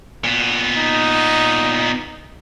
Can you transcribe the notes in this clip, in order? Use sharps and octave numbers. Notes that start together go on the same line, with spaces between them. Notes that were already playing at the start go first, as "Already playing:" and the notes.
A#2 B3
D#4